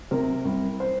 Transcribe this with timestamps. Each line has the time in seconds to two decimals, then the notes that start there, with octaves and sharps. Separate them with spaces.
0.11 C3 A#4
0.45 C2
0.80 C5